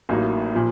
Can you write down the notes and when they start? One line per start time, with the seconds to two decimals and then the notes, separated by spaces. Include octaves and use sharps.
0.09 A1 A2 F#3 A#3 D#4
0.54 A#2 F3